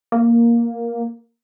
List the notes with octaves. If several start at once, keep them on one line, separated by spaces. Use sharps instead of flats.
A#3